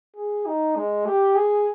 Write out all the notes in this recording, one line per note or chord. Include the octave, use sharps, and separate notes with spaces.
G#4
D#4
G#3
G4
G#4